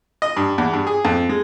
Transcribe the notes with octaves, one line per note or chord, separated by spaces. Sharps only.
D#5
G2
E2
G2
G#4
F2
G#3